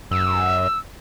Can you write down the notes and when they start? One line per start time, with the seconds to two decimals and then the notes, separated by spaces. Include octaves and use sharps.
0.11 F#2 E6